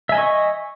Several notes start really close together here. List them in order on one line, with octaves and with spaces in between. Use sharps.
E5 G#5 D#5 C#6